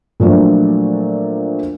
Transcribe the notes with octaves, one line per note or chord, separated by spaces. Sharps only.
A#2 F3 F#3 A3 D4